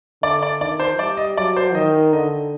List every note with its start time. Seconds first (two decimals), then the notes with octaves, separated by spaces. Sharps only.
0.23 D3 D5
0.43 D5
0.60 D#3 D5
0.80 C5
0.99 G3 D5
1.17 D#5
1.37 F#3 D5
1.56 C5
1.75 D#3 D#5
2.13 D3 D#5